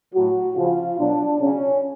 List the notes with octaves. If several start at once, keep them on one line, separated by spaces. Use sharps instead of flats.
A2 F#3 F#4
C#3 F3 F4
B2 F#3 D4
C#3 F#3 C#4